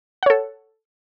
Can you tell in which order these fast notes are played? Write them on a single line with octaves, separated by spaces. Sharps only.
F#5 C#5 A4